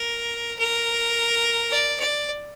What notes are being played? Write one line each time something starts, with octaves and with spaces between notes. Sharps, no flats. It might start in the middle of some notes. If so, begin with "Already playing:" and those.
Already playing: A#4
A#4
D5
D5